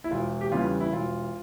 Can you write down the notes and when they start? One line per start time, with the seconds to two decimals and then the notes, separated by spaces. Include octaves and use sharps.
0.04 E4
0.11 E1 F4
0.41 G4
0.52 E2 C#3 E3 G3 F4
0.80 E4
0.92 E1 F4